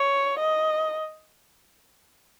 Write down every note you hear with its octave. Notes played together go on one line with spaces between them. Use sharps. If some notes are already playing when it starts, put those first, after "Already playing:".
Already playing: C#5
D#5